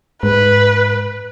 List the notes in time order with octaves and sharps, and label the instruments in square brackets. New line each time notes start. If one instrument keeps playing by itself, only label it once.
[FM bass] G#2 [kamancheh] B4